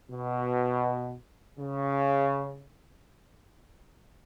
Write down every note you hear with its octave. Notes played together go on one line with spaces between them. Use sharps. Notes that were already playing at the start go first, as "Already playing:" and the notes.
B2
C#3